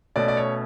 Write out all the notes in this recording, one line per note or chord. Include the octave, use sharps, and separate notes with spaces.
B2 A3 C#4 D5
D5
C#5